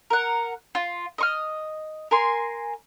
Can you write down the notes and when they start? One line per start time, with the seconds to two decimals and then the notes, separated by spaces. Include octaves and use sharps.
0.10 A#4 F#5
0.75 F4
1.18 D#5 C#6 F6
2.11 A#4 G#5 C6